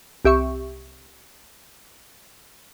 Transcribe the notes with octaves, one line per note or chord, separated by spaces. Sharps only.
C2 G4 E5 C#6